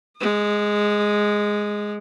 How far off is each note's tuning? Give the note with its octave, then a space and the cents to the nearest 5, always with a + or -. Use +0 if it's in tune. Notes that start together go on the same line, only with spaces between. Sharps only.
G#3 +0 D#6 -40